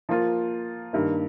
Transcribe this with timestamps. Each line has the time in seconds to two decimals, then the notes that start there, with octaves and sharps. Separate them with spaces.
0.09 F3 A#3 F4
0.93 G2 D#3 A#3